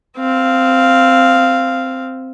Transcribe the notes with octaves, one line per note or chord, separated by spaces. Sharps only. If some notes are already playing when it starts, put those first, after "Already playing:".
C4 F5